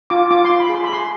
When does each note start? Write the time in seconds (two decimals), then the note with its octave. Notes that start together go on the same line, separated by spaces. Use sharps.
0.10 F4 D6
0.31 F4 D6
0.45 C6
0.50 F4
0.60 B5
0.69 G#4
0.74 C6
0.84 B5
0.89 G#4 C6